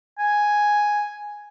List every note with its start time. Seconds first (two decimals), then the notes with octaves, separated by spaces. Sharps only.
0.19 G#5